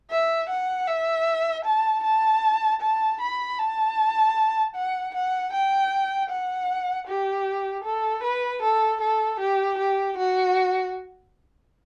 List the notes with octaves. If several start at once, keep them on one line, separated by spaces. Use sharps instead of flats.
E5
F#5
E5
A5
A5
A5
B5
A5
F#5
F#5
G5
F#5
G4
A4
B4
A4
A4
G4
G4
F#4